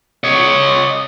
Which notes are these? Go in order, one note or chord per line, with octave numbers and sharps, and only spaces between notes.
C#5 D#5